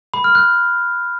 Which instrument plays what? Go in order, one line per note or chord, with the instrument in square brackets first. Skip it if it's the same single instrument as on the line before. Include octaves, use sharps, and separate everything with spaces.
[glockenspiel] B5
F6
F#6